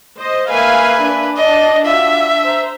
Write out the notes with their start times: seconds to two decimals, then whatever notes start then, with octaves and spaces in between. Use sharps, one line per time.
0.20 C5 D#5
0.50 A#3 B4 E5 F5 G#5
1.04 D4
1.37 D5 D#5 A5
1.86 F4 F#4 E5
2.45 C5 A#5